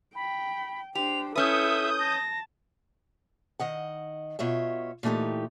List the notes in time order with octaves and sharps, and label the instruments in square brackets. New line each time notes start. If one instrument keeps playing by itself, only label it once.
[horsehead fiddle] G5 [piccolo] B5
[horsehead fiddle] D4 C5 [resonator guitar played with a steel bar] G4 [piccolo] F7
[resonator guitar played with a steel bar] C#4 B4 [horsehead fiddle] E4 A4 [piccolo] E5 [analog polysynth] D#6 G6
[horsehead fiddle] A5 [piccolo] A#6
[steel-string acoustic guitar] D#3 D#5 F#5
B2 F4 C#5 E5
A#2 E3 A3 D#4 G4